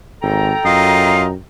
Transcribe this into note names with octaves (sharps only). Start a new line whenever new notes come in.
G#1 A4 G5 A#5
F#2 F4 D#5 C7